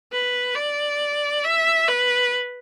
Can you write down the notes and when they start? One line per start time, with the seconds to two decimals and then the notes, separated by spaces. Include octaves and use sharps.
0.13 B4
0.56 D5
1.44 E5
1.88 B4